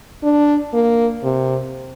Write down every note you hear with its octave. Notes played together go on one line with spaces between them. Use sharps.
D4
A#3
C3